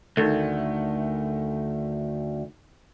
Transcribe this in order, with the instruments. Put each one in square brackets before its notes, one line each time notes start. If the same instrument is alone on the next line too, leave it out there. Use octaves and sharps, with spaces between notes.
[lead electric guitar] D2 [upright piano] D#3 A3